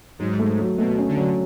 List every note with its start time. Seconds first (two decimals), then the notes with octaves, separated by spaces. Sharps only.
0.19 G#2 F#3
0.39 A3
0.59 F#3
0.78 B2 A3
0.98 C#4
1.08 D3
1.17 F#3